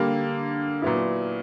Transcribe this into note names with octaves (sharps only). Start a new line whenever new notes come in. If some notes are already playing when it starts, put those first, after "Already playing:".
Already playing: D3 G3 A#3
A#2 F#3 B3 E4